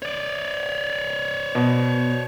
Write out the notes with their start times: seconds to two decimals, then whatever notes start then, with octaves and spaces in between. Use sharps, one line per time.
0.02 C#5 D5
1.55 B2